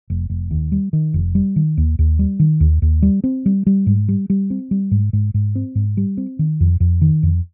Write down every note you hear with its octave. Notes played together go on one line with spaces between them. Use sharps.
F1
F1
D#2
G3
D#3
F1
G3
D#3
D#2
D#2
G3
D#3
D#2
D#2
G3
C4
G3
G3
G#2
G3
G3
C4
G3
G#2
G#2
G#2
C4
G#2
G3
C4
D#3
F2
F2
D#3
F2